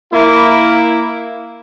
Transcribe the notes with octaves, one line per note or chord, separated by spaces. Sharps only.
A#3 E4